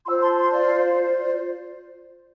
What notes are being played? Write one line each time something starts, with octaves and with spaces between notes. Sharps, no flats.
F4 C5 C6 E6
A5 C6
A5 C6
D5 F5
D5